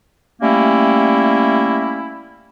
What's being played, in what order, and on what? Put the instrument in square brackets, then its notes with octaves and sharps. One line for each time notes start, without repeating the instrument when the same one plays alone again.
[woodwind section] G3 A3 A#3 C#4 E4